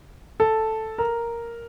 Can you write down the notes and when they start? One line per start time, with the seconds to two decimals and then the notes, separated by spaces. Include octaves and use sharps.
0.40 A4
0.98 A#4